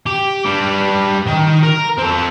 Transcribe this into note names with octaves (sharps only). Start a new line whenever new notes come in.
G4
G3 D4
D#3 G5
A#4
C4 A4